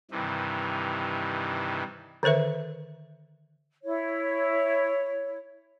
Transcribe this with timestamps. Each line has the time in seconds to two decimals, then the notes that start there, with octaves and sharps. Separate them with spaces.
0.11 G2 C3 D#3 E3
2.23 D3 D#3 A4 B4 E5
3.84 E4 C#5